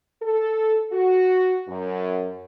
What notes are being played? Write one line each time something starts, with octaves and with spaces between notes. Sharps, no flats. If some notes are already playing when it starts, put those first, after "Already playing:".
A4
F#4
F#2